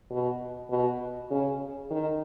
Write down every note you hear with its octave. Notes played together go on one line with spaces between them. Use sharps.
B2
B2
C#3
D#3